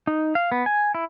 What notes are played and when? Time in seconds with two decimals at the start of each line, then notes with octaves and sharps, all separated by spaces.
0.07 D#4
0.35 F5
0.52 B3
0.66 G#5
0.95 E4